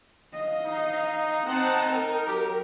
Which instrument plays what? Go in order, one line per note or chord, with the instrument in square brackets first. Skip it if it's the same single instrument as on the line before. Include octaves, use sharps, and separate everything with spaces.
[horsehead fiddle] D#5 F5
[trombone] D#4
[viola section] C4 F#5 A5 [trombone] D#4 [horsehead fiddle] G5
[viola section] A#4
[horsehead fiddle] F#3 [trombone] G4